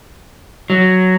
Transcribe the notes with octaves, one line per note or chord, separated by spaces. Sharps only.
F#3